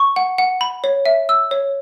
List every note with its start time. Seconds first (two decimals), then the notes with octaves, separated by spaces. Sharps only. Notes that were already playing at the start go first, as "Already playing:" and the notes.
Already playing: C#6
0.16 F#5
0.38 F#5
0.61 B5
0.84 C#5
1.06 E5
1.29 E6
1.51 C#5